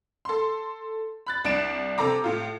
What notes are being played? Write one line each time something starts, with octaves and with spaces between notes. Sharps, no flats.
A4 C6
B5 F#6 A6
C2 D4 D7 E7
C3 A4 A#5 D6
A2 F4